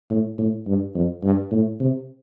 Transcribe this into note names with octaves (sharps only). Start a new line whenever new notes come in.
A2
A2
G2
F2
G2
A2
C3